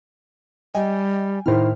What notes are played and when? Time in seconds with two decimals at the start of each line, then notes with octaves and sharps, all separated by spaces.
0.75 G3 D#5 G5 G#5
1.46 A2 D#3 E4 C5 F6